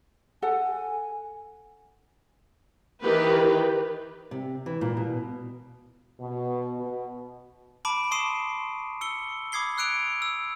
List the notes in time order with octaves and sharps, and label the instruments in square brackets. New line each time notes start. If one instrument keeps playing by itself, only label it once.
[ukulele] A4 F#5 [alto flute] G#5
[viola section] D#3 E3 G4 B4
[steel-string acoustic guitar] C3
E3
A#2
B2
[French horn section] B2
B2
[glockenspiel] A5 B5 D6 D7
C6 C#6 D#6 C7 D#7 E7
E6 C#7 G7
B5 D6 D#6 G#6 C7 G7
E6 F#6 C#7 D7 F7
E6